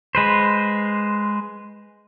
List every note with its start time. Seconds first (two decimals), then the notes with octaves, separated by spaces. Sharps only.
0.15 G#3 B4 C5